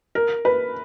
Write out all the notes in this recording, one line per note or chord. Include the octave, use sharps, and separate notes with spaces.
A#4
B4